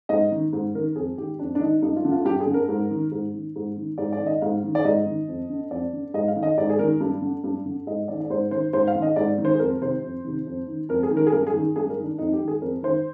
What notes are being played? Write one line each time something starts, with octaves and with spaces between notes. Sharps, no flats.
G#2 D#5
D#3
G#2
D#3 A#4
F2 G#4
D#3 G4
F2 D4
D4
D#3 D#4
G2 D#4
F4
D3
F4
G2 G4
G#4
D3
A#4
G#2
D#3
G#2
D#3
G#2
D#3
G#2 D5
D5
D#3
D#5
G#2 F5
D#3
D5
G#2 D#5
D#3
F2
D3
F2 D5
D3
G#2 D#5
F5
D#3
D#5
G#2 D5
G#4
D#3 A#4
G2
D3
G2
D3
G#2 D#5
D#3 D5
D5
G#2 C5
D#3 C5
G#2 C5
F5
D#3
D#5
G#2 D5
D#3
C5
G#4
F2 A#4
C3 D#3 C5
F2
C3 D#3
F2
D#3
F2 A#4
G#4
D#3
A#4
G#4
G2 A#4
G#4
D#3
G2 G#4
A#4
D#3
D4
F2 D#4
G4
D#3
G#4
F2 A#4
D#3 C5